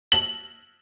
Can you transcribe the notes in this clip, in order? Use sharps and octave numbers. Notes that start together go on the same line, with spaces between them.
F#7